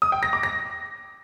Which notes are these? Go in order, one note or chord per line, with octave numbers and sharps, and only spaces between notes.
D#6
G5
A#6
D6
A#6